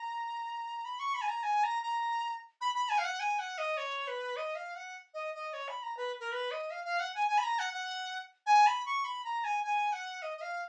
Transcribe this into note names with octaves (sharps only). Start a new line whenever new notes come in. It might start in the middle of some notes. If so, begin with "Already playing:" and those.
Already playing: A#5
B5
C#6
B5
G#5
A#5
G#5
A#5
A#5
B5
B5
G#5
F5
F#5
G#5
F#5
D#5
C#5
B4
D#5
F5
F#5
D#5
D#5
C#5
B5
A#5
B4
A#4
B4
D#5
F5
F5
F#5
G#5
G#5
B5
A#5
F#5
F#5
G#5
B5
C#6
B5
A#5
G#5
G#5
F#5
D#5
D#5
F5